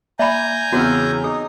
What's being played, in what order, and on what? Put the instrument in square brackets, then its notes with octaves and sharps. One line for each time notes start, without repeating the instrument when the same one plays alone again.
[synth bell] A#3 D5 [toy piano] E5 B5 [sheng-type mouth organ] G#5 A#5 G6
[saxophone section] E2 C#3 [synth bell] B3 C4 [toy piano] F#4 G#4 C#5
[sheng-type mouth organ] D#4 [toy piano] G#4 [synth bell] D#6